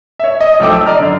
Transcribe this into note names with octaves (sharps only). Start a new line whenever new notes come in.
C#5 E5
D#5
B1 F3 A3 G5 D6 E6
E6
D5 D#5 A#5 F6
F#2 D3